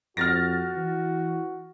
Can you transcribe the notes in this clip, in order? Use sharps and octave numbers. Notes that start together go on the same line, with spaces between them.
F2 F#4 F6 A6 A#6
E3